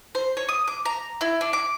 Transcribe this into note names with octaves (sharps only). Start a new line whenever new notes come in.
C5
C#5
D#6
D6
A#5
E4
D4
D6